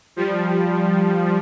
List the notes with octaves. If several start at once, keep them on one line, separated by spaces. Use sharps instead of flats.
F3 G3